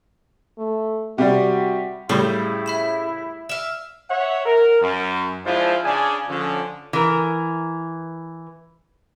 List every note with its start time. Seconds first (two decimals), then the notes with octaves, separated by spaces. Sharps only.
0.59 A3
1.18 C3 G3 F#4
2.09 A2 C#3 G3 E4 B5 C6
2.66 E5 B5 E7
3.49 E5 F5
4.10 C#5 E5 F#5
4.46 A#4
4.82 F#2
5.45 F3 G#3 D4 E4 F4 C5
5.85 C#3 D4 G#4 D5 G#5
6.28 D3 F3 C#4
6.93 E3 A#4